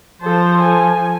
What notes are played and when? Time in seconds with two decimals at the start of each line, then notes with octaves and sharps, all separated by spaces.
0.22 F3 A4 C5
0.62 G#5